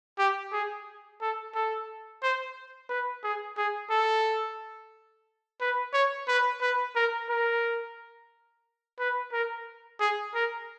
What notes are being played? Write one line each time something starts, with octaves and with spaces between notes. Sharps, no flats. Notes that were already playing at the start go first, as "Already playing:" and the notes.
G4
G#4
A4
A4
C5
B4
G#4
G#4
A4
B4
C#5
B4
B4
A#4
A#4
B4
A#4
G#4
A#4